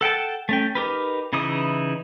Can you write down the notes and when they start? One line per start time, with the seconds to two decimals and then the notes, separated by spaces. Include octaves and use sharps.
0.01 A4 F#5 G5 A5
0.49 A3 C#4 G5
0.75 D#4 G4 A#4 B4
1.33 C#3 E3 D#4 E4 D#6